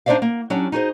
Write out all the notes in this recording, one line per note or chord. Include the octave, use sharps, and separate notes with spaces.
D4 D#4 C5 D5 E5 F5
A#3
F#3 C#4 D4 G4
D#4 F#4 G#4 C5